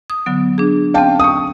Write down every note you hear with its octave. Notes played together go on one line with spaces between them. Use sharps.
D#6
D3 F#3 B3
D4 G#4
C4 C#4 F5 G5 A5
C#6 D#6